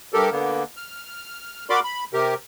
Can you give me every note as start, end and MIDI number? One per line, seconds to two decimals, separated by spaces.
0.14 0.29 43
0.14 0.29 67
0.14 0.29 69
0.14 0.29 70
0.32 0.64 50
0.32 0.64 58
0.32 0.64 59
0.77 1.65 89
1.70 1.80 66
1.70 1.80 70
1.70 1.80 74
1.70 1.80 83
1.70 1.80 84
1.70 1.80 86
1.84 2.04 83
2.13 2.34 48
2.13 2.34 67
2.13 2.34 70